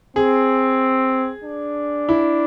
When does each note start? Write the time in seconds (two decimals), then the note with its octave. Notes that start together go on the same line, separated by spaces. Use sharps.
0.16 C4 G#4
1.44 D4
2.09 E4